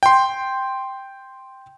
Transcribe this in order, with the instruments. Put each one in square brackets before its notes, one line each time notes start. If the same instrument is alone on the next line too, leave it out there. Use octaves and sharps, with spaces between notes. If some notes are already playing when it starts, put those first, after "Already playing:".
[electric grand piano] G5 C6